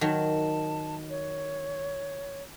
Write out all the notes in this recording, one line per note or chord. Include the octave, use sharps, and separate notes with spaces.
D#3 F#3 A5
C#5